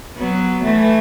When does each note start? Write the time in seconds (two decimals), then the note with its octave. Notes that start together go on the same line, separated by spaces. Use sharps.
0.17 F#3 B3
0.63 E3 A3